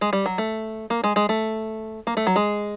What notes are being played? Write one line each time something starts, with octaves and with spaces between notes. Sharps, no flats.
G#3
G3
F#3
A3
A#3
G#3
G#3
A3
A#3
A3
F#3
G#3